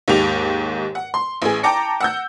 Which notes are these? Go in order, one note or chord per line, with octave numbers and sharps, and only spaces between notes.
D#2 G#2 G4 F7
F#5
C6
A1 G#4
G5 A5 A#5 D6 A#6 C#7
F#5 E6 G6